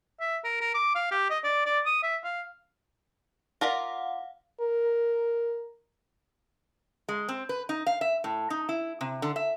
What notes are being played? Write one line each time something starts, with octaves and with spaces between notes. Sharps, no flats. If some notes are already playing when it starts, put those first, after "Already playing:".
E5
A#4
A#4
D6
F5
G4
D#5
D5
D5
D#6
E5
F5
F4 A#4 D5 F5 F#5
A#4
G#3
C4
B4
D#4
F5
E5
A2
D#4
E4
C3
D3
E5